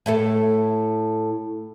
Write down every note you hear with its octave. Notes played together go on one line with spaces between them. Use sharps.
A2 E4 A4